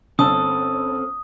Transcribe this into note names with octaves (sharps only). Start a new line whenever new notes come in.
G1 C4 C#4 A4 A5 D#6 E6